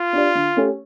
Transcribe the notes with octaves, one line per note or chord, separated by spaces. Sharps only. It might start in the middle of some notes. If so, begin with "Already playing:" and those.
Already playing: F4
D4 G4 D5
D3
A3 C#4 G4 C#5